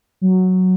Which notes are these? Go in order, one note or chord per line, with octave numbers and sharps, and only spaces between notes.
F#3